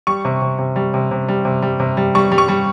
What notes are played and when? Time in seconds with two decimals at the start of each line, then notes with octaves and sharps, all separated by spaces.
0.07 G3 C#6
0.25 C3
0.42 C3
0.58 C3
0.76 G3
0.94 C3
1.11 C3
1.28 G3
1.45 C3
1.62 G3
1.80 C3
1.97 G3
2.15 G3 C#6
2.32 G3
2.38 C#6
2.48 G3